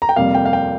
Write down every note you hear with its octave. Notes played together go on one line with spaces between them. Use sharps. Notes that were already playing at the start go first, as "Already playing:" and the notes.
A#5
G5
F2 C3 G3 A#3 F5
G5
F5
G5